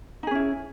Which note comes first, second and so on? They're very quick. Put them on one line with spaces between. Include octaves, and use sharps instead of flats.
D#4 G#4 C#4 E4